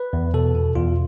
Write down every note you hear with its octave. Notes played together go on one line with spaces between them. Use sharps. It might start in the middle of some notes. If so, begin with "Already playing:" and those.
Already playing: B4
E2
B2 A4
B2
E2 F4